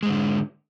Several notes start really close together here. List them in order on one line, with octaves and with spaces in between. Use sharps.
G#3 G#2 D3